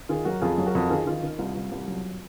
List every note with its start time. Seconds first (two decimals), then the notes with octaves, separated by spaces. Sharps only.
0.09 D#3 F4 G#4
0.25 F#3 F#4 A#4
0.41 F2 F4 G#4
0.58 F#3
0.66 F#4 A#4
0.75 F2
0.90 D#3 F4 G#4
1.07 D#3 F4
1.23 D#3
1.39 C2 F4
1.55 C2
1.72 C2
1.87 F#3